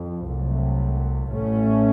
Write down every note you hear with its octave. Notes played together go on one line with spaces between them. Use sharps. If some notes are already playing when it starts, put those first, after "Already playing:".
Already playing: F2
C2 C3 F#3 A3
A1 A2 A3 C#4